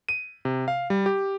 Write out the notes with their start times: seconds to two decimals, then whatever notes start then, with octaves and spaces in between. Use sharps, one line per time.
0.09 D#7
0.45 C3
0.68 F5
0.90 G3
1.06 G4